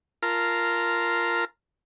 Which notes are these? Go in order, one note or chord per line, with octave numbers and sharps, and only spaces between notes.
F4 A#4 A5 A#5 C6 F6